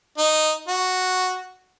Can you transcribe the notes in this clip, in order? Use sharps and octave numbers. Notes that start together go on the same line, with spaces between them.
D#4
F#4